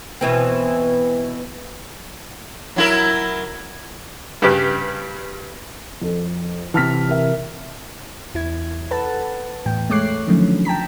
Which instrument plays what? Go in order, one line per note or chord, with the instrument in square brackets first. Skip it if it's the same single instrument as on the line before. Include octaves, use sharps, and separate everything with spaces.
[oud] B2 E3 C4
[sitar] F#3 E4 A#4
[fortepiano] G2 C#3 G4 B4
[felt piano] F2 A4
[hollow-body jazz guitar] C3 E3 [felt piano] A5 F6 B6
[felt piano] A#4 E5
[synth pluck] E2 E4 G#6
A4 B4 F#5 A5
E2 A2 G5
G#3 A3 C#5 D6 F#6 C7
D3 D#3 F3 F#3 A3 C#4
G5 A5 A#5 B6